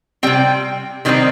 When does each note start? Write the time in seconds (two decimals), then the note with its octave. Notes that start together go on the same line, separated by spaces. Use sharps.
0.23 C3 G3 C4 G5
1.05 C3 D#3 G3 C4 D#4